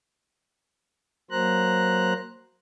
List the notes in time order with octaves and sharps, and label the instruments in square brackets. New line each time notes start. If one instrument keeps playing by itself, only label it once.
[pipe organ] F#3 A#3 C5 A#5 F#6